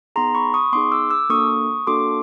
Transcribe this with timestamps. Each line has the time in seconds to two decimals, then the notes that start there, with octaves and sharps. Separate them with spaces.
0.16 B3 D#4 G#4 A#5 C6
0.35 B5 C#6
0.54 C#6 D#6
0.73 B3 D#4 G#4 C6 D6
0.92 D6 E6
1.11 D6 E6
1.29 A#3 D4 F#4 A4 C#6 D#6
1.87 A#3 D4 F#4 A4 C6 D6